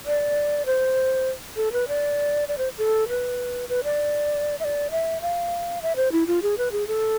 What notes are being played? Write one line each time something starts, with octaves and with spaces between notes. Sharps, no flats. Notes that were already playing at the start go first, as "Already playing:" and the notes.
D5
C5
A4
B4
D5
D5
C5
A4
B4
B4
D5
E5
D5
E5
F5
E5
C5
E4
F4
G#4
B4
G#4
A4